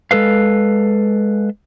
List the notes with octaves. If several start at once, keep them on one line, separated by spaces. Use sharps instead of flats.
G#3 A4 B4 F5